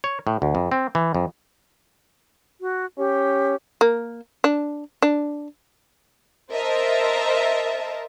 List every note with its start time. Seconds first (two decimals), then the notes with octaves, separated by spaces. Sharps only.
0.04 C#5
0.27 A2
0.42 D2
0.55 F2
0.72 C4
0.95 E3
1.15 F2
2.61 F#4
2.98 C#4 G4
3.81 A#3
4.44 D4
5.02 D4
6.51 A#4 C5 D#5 E5 A5